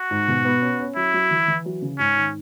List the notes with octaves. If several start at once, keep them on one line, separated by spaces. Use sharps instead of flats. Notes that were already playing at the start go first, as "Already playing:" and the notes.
Already playing: F#4
G#2
B2
B3
C#4
C#4
F#3 E4
F#3
E3
E3
F#3
C#3
G#2 C#4
D#3